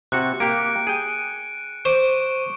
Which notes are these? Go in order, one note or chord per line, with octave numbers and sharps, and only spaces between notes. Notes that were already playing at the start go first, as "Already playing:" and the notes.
C3 F#4 F#6 C#7
A#3 G4 D7
G#4 G5 D#7
C5 C#6 D6 D7